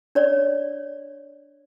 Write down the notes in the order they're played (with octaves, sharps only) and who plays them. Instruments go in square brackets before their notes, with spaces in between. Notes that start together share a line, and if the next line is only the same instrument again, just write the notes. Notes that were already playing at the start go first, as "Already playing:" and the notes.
[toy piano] D4 C#5 D5